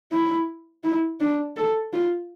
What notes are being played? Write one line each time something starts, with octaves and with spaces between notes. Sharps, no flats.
E4
E4
D4
A4
F4